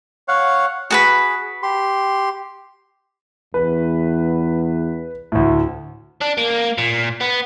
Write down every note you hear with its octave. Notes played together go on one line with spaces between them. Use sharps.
C#5 F5 F#5
F#4 G#4 B4 B5
G4 C6
E2 B4
D2 A2
D4
A#3
A#2
B3